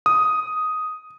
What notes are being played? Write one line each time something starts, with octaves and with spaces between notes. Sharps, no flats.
D#6